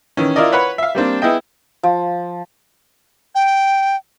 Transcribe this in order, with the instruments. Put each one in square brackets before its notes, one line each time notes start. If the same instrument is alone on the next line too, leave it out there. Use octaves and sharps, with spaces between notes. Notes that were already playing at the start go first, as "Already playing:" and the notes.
[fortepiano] D#3 E3 C#4
E4 F4 A#4 D5 D#5
B4 C#5 F#5 B5
E5 F5
G3 A#3 C4 D4
B3 E4 G#4 D#5 G5
[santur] F3
[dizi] G5